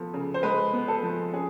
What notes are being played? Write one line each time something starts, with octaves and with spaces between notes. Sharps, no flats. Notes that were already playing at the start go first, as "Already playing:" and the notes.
Already playing: F3 B3 A4
C#3
C5
G#3 B4
B3
A4
F3
C#4 G#4